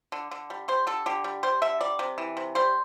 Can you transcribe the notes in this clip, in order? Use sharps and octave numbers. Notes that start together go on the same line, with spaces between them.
D3
D3
G3
G3 C5
D3 A4
D3 G4
G3
G3 C5
D3 E5
G3 D5
C3
E3
C3
G3 C5